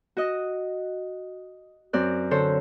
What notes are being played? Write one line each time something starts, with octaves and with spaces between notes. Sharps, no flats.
F#4 D#5
F#2 C4 D5 F#6
D3 A4 C5 C#5